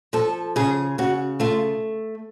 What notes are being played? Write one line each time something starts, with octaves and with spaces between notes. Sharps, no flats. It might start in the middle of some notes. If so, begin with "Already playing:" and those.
F3 A4
C#3 G#4
C#3 F#4
A3 F4